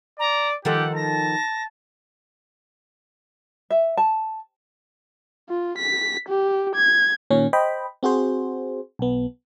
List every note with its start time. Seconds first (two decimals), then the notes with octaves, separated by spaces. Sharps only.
0.19 D5 A#5
0.65 D#3 F3 G4 A4 F#5
0.95 A5 A#6
3.70 E5
3.97 A5
5.49 F4
5.78 B6
6.29 G4
6.76 G#6
7.30 A#2 D#3 C#4
7.53 C5 D#5 G5 B5
8.03 C4 F#4 G#4 C5
8.99 B1 B3